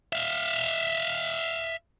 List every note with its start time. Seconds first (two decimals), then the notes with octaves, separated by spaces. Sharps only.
0.13 E5 F5